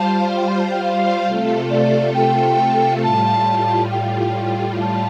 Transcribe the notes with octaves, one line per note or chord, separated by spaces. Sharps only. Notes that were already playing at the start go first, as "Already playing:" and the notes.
Already playing: G3 F4 C5 F5 A5
G5
C6
A5
G5
F5
C3 A3 F4 A4
D5
G5
A2 G3 F4 A5
G5
A5